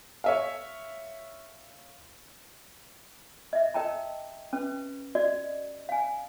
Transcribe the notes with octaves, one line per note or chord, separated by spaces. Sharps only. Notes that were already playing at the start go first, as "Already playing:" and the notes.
C#5 E5 F5
D#5 E5
A#4 D#5 G5 A5 A#5
C#4 B4
F#4 D5 D#5
F5 G#5